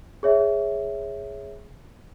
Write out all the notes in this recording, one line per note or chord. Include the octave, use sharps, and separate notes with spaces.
G#4 C#5 E5